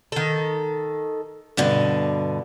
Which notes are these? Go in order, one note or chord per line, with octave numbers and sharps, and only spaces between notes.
D#3 A4
G2 B2 D3 D5